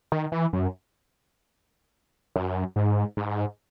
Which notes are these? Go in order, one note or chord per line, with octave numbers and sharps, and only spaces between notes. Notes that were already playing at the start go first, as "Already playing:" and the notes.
D#3
E3
F#2
F#2
G#2
G#2